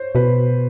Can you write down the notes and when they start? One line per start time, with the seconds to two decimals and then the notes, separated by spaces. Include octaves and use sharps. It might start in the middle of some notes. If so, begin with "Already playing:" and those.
Already playing: C5 C#5
0.15 B2 B4